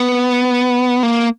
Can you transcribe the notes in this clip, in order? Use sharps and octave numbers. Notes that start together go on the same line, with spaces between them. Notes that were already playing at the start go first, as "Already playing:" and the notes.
Already playing: B3
A#3